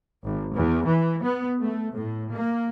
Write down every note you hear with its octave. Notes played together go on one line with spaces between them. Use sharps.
G#1
E2
E3
B3
A3
A2
A#3